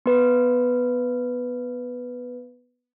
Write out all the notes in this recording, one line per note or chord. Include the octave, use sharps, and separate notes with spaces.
B3 B4